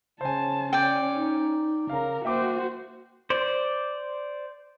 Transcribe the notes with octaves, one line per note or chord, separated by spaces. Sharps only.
C#3 C5 G#5 A5
C#4 D5 G5
D#4
C#3 A#4 F5 A#5
A#3 F#4 C5 E5 G5 D6
C5 D5